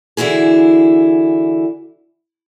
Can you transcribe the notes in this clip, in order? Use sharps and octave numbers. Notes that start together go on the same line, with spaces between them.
D3 E3 E4 F#4 G#4